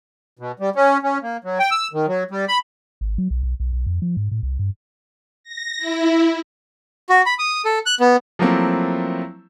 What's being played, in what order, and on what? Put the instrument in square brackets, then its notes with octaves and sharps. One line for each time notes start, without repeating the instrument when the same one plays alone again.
[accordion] B2
G3
C#4
C#4
A#3
F#3
G5
E6
D#3
F#3
G3
B5
[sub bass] G#1
F#3
B1
B1
B1
B1
F2
F3
G#2
A2
C2
G2
[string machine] A#6
E4
[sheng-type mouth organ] F#4
B5
D#6
A4
F#6
B3
[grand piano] F3 F#3 A3 A#3 C4 E4